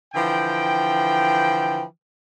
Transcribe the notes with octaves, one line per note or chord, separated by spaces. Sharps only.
D3 E3 F3 G5